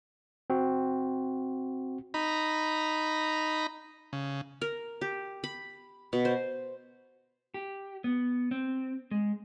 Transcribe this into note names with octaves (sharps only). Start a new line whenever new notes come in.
C4 F#4
D#4 A#5 B5
C#3
A#4
G4
B5
B2
C5
G4
B3
C4
G#3